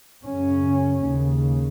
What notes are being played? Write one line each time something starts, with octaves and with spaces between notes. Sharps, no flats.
F#2 C#3 C#4
D#2 C#3